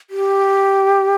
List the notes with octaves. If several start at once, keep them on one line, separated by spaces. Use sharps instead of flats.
G4